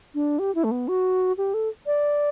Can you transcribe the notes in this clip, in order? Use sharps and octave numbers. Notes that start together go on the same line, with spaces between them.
D4
G4
E4
A3
B3
F#4
G4
A4
D5